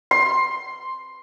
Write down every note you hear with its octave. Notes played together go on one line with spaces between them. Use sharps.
C6